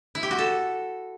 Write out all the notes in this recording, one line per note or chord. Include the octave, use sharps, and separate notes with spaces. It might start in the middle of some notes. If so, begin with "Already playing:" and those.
E4
G4
F#4
A4